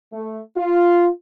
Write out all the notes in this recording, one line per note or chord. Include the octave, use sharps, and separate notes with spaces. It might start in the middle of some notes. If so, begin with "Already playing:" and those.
A3
F4